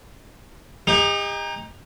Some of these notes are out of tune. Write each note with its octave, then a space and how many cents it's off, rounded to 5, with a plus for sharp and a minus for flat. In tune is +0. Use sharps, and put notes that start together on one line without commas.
D#4 +0 G4 +45